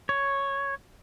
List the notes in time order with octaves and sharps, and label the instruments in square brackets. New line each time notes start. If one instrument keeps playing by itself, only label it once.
[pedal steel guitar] C#5